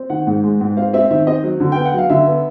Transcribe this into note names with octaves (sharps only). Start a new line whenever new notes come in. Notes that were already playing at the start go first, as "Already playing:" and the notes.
Already playing: C4
D#3 F#5
G#2
G#3
G#2
C4 F5
C4 E5
D#3 E5
C4 D#5
F#3
D3
B3 G5
F#5
F#3 F5
D3 E5
B3